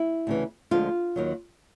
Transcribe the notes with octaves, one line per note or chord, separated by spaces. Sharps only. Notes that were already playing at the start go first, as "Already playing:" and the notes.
Already playing: E4
D2 C#3 E3
D2 D3 F3 G#3 F4
D#2 D#3 F#3